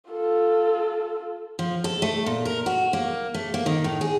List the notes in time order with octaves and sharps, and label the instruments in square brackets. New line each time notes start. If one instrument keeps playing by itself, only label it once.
[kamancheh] F4 A4
[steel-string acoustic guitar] F3
A4
A3
A#2
A#4
F#4
A#3
A3
A#3
D#3
A2
G#4